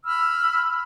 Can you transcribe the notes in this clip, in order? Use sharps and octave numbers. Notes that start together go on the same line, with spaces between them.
B5 E6 F6